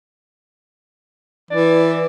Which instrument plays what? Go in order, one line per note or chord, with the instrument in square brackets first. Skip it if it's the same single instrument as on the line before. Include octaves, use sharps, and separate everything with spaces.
[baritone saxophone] E3 [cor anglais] D5